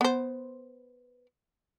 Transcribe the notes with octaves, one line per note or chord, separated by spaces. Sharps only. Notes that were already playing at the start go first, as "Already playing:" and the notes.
B3 C5